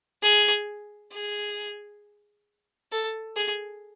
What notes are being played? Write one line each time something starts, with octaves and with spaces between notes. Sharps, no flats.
G#4
G#4
A4
G#4